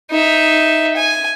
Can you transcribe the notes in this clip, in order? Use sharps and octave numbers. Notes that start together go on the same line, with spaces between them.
D#4 E5
G#5